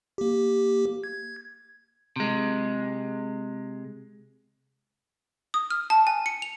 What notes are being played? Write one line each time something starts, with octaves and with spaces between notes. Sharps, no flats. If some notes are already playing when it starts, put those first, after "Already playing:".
A#3 G4
G#6
C3 G#3
D#6
F6
A5
G#5
C#7
F7